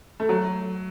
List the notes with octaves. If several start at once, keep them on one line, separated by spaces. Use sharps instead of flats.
A3
F#3